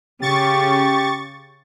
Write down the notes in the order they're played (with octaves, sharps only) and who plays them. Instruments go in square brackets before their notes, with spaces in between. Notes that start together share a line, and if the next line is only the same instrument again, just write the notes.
[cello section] C#3 [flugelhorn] G4 [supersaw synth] C#6 A6